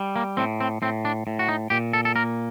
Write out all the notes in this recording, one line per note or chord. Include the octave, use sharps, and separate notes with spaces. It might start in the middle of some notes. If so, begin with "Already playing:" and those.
Already playing: G3
A#3
A2 C4
C4
A2 C4
D4
A2
F#4
D#4
A#2 G4
A4
A4
A#3 A#4